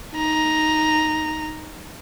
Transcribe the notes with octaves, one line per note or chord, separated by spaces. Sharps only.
D#4 A#5